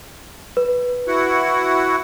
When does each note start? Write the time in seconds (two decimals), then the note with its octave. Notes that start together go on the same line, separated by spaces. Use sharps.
0.57 B4
1.08 E4 F#4 F#5